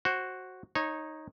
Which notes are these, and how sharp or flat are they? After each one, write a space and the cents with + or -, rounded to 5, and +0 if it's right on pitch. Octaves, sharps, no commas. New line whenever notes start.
F#4 +0 C5 +25
D#4 +0 C#5 -20